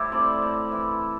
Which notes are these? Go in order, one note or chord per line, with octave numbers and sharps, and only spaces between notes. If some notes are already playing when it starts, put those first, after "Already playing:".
Already playing: A2 G3 E4 G4 C5
C4 A4 D5
A2
E3